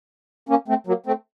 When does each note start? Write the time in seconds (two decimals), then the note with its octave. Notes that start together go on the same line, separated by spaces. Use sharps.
0.49 A#3 C#4
0.68 A3 C4
0.87 F#3 A#3
1.06 A3 C4